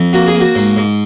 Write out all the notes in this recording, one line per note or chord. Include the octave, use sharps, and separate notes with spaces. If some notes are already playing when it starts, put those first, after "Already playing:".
Already playing: F2
A#3 F#4
G#4
A#3
F#4
G#2
G#2